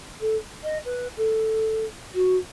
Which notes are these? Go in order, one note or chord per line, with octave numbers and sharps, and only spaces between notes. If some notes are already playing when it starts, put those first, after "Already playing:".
A4
D#5
B4
A4
F#4